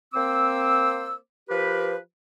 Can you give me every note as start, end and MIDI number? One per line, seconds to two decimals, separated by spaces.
0.14 1.16 58
0.14 1.16 60
0.14 1.16 72
0.14 1.16 86
0.14 1.16 88
1.49 1.97 53
1.49 1.97 67
1.49 1.97 70
1.49 1.97 71